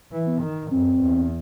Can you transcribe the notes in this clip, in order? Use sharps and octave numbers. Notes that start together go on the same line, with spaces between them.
E3
B3
D#3
F#2 C4
E2